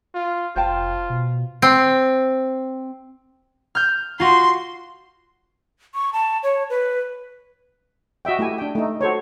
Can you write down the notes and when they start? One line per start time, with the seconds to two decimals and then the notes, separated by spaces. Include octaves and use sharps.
0.14 F4
0.56 F1 F4 C5 G5 A5
1.10 B2
1.62 C4
3.75 F6 G6
4.20 F4 F#4 C6
5.94 C#6
6.13 A5
6.43 C#5
6.70 B4
8.25 F#4 D#5 E5 G5
8.39 A3 E4 G4 G#5
8.58 D4 G5
8.75 A3 D#4
9.01 F#4 A4 C5 C#5